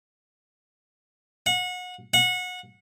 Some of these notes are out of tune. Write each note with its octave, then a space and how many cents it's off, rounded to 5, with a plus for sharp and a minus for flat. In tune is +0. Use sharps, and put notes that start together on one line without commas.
F#5 -30
F#5 -25